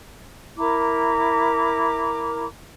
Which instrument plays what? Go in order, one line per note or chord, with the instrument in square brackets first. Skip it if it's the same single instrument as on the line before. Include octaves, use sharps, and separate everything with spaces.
[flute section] E4 A#4 A#5 D6